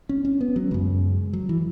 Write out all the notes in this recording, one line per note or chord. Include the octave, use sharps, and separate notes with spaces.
C#4
C#4
B3
F#3
F#2 C#3 G#3
F#3
E3